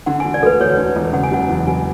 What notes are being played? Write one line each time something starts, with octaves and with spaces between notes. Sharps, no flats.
D3 F#5
E1 G#5
D5
D2 A4 B4
E1 C#5
D3
E1
C#3 F#5
G#5
F#1 F#5
E2
F#1 G#5